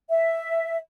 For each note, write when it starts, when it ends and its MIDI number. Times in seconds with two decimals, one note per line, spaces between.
0.09 0.77 76